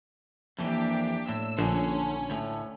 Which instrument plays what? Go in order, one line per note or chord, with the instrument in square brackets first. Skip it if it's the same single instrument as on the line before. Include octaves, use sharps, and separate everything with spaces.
[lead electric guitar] F2 E3 [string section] A#3 D4 G4
[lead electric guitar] A2 [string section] E6
[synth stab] A#1 [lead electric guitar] D3 [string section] C#4
[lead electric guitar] D2 A2